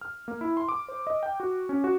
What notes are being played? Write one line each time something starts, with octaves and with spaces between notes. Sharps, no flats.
F6
A#3
E4
C6
D6
C5
D#5
G5
F#4
C#4
F#4